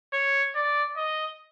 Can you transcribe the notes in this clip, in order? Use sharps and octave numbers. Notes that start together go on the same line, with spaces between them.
C#5
D5
D#5